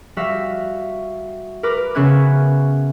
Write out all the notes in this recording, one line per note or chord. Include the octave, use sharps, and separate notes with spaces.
G3 F#4 E5 F5
A#4 B4 D6 F6
C#3 B3 C#4 E5 F#6 G#6